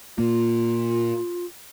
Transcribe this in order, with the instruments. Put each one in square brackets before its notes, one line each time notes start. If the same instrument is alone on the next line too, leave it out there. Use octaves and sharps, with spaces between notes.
[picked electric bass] A#2 A#3 [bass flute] F4